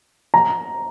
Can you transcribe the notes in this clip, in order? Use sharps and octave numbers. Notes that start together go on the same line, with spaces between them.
A#5